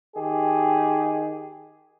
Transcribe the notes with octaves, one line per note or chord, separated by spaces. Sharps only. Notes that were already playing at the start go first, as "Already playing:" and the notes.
D#3 G4 G#4